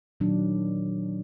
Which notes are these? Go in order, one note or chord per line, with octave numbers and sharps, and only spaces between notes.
A#2 D#3 F#3 D4